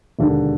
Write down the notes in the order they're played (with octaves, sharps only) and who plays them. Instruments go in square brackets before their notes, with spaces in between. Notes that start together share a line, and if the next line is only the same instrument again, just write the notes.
[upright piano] E1 D#2 D3